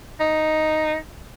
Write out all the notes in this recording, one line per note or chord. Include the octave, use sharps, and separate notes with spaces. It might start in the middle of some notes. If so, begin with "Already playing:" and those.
D#4